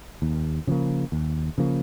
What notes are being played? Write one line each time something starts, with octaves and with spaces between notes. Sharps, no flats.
D#2
C#3 F3 A#3
D#2
C#3 F3 A#3